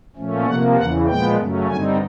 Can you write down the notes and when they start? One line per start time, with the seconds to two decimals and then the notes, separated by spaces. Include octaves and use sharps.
0.16 A#2 F3 A3 C#4
0.46 C3 F3 A#3 F#5
0.76 E2 C#3 E3 F#5
1.06 A#2 F3 G#3 B3 G5
1.37 F#2 C#3 F#3 A3 C#4
1.68 G2 D3 G3 C4 D#4 G#5